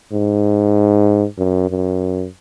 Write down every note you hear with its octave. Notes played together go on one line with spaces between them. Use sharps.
G#2
F#2
F#2